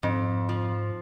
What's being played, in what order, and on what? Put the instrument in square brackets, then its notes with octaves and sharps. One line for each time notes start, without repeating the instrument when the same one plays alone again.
[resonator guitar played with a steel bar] F2 [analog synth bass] G#2
[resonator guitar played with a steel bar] F3